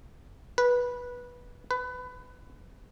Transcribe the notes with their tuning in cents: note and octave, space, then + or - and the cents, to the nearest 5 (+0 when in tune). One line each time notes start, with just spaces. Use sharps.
B4 -15
B4 +20